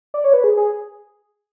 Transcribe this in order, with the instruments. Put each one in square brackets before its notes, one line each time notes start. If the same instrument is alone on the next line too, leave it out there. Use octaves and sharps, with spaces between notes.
[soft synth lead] D5
C#5
B4
G#4
G#4